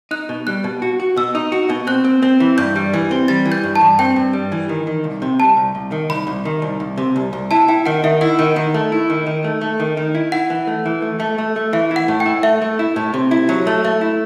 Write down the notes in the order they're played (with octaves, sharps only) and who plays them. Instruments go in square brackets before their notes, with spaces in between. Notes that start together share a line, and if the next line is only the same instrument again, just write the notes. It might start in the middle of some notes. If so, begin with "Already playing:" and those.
[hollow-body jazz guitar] D#4 [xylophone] F#6
[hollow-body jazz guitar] B2
[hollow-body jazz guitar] G3 [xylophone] F#6
[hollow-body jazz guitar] B2
F#4
F#4
[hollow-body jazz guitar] B2 [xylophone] E6
[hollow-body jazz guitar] D#4
F#4
B2
[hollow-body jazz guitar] C4 [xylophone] F#6
[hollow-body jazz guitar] C4
C4
E3
[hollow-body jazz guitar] G2 [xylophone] G6
[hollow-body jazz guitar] G3
E3
C4
[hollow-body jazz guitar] G3 [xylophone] A6
[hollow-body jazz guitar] E3
[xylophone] G6
[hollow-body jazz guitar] G2
[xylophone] A5
[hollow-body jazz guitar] G2
[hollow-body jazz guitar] C4 [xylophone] G5
[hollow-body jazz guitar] G2
G3
E3
D#3
D#3
C2
C3
[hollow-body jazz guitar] C2 [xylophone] A5
[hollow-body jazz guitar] C2
C2
D#3
[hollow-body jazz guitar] C2 [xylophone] B5
[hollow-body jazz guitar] C2
D#3
C2
C2
C3
C2
C2
[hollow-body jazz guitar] E4 [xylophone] A5
[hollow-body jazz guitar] E4 [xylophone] G5
[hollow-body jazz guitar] D#3 [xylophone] F#5
[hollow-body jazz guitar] D#3 [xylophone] E5
[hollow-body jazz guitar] E4 [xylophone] F#5
[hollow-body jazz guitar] D#3
D#3
A3
E4
D#3
D#3
A3
A3
D#3
D#3
E4
[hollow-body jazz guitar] E4 [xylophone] F#5
[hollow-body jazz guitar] E3
A3
E3
A3
A3
A3
A3
[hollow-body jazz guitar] E3 [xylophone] E5
[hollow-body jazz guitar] E4
[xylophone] F#5
[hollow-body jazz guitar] A2
[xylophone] G5
[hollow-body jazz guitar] E4
[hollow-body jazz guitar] A3 [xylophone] E5
[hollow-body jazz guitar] A3
E4
A2
C3
E4
F#3
A3
[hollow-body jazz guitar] A3 [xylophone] E5
[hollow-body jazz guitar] E4